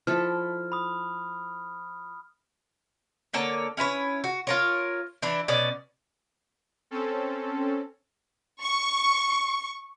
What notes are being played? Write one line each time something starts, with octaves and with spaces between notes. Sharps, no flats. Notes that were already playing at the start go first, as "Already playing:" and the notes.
F3 E4 A4 F6
B5 D#6
D3 A#3 C#5 A5
C#4 E4 B4 C#5
F#4
F4 A#4 C#5
E3 D4 E4
B2 C#4 D5
C4 C#4 A4
C#6